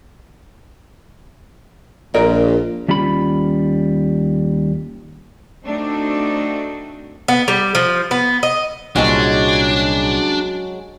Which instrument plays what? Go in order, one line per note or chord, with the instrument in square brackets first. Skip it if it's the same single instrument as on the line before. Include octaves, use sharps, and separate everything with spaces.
[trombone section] A#1 [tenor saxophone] A#2 [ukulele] A#4 D#5
[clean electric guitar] D#2 G3 C#4 F4 B5
[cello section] A3 C4 D4 D#4 F#4
[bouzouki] B3
G3
F3
B3
D#5
[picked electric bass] C2 A#2 [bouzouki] F#3 G#3 C#4 [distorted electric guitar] D4